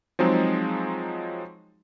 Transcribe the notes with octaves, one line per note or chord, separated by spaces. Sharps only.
F3 F#3 G#3 C4 D#4 G#4